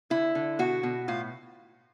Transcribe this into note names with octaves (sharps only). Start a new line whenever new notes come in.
D3 E4
D3
B2 F#4
B2
A2 F4